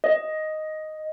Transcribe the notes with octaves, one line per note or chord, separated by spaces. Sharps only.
D#5